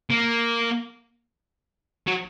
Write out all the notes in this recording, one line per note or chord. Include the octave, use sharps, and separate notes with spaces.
A#3
F#3